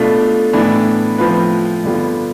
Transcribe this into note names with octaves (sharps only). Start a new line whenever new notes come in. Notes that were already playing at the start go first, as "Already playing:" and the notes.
Already playing: B2 A3 D4 F4
A2 E3 B3 D4
A2 F3 C4 F4 B4
G2 D3 G3 B3 F4